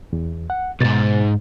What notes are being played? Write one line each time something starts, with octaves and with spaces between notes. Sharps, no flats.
E2
F#5
B1 G#2 B2 A6